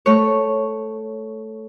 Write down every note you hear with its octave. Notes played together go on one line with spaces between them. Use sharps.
A3 C#5